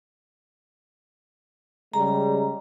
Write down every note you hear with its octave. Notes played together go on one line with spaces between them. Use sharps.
C#3 G3 G#3 A#5